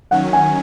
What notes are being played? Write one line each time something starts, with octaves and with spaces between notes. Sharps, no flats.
D#3 F#3 C#4 F#5
G#5